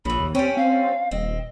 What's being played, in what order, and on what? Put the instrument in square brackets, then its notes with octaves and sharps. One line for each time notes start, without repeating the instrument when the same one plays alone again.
[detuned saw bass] A#1 [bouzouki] C#3 E3 [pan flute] B5
[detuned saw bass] D#2
[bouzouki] G3 C#4 [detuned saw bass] C4 [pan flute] G5
[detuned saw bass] C4 [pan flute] F5
[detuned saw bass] D#1 [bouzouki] C4 [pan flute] D#5